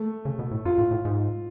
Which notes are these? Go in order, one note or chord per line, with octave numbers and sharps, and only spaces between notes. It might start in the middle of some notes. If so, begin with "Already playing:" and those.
Already playing: A3
C#3
B2
A2
F#2 F4
A2
A2
G#2